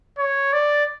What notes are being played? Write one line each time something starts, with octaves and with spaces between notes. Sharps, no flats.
C#5
D5